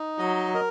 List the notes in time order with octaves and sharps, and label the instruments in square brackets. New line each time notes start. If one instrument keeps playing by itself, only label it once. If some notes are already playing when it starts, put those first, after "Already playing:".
Already playing: [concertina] D#4
[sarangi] F#3 [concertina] D#5
[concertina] A#4